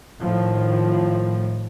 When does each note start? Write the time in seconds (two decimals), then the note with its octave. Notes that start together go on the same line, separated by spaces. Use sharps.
0.21 A2 D#3 F3